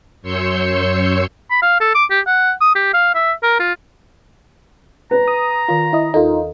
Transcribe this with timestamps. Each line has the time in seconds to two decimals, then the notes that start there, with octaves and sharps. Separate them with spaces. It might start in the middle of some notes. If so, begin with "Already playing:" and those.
0.22 F#2 C#5 C6 E6 G6 C#7
1.51 B5
1.62 F5
1.81 A4
1.95 D6
2.10 G4
2.27 F#5
2.61 D#6
2.75 G4
2.94 F5
3.15 E5
3.43 A#4
3.59 F4
5.11 B4 A#5
5.28 D#6
5.68 D#3 F4 A#4
5.93 E4 D#5
6.14 D#2 D#4 F4 A4 A#4